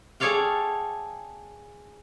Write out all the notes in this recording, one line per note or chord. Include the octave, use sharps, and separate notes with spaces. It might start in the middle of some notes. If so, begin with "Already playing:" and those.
G#4 A4 C#5 D5 F5 G5